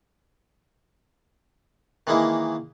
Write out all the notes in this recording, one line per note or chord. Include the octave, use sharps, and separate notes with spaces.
D#3 E3 G#3 A#3 E4